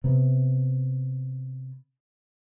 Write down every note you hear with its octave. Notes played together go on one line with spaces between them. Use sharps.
C3 B3